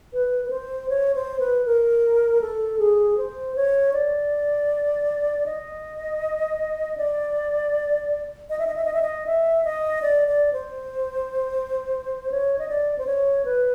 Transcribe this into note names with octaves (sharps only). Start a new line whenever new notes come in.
B4
B4
C5
C#5
C5
B4
A#4
A4
G#4
C5
C#5
D5
D#5
D5
D#5
E5
D#5
E5
D#5
E5
D#5
E5
D#5
D5
D5
C5
C#5
D#5
D5
C5
C#5
B4